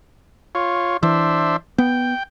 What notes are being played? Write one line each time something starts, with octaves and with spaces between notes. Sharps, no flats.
F4 C#5
E3 D4 C5 E5
B3 G5